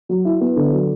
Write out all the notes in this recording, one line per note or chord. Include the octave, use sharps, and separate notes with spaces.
F#3
E4
B3
D3
F#3